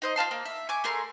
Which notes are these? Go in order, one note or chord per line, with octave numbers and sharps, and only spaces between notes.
D#4 C5 D#5
F4 F5 A5 C6
A#3
E5
G#5 C#6 D6
A3 G#4 A#4 C6